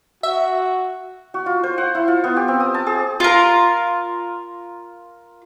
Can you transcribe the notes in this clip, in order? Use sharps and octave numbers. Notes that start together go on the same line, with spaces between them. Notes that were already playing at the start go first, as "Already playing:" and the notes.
F#4 E5
F#4
F4
C5
F#5
E4
F4
B3
G4
C4
D#6
A5
G#4
F4 A#4